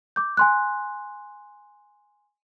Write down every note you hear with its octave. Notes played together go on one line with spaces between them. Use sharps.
D6 G6
G#5 C6 F#6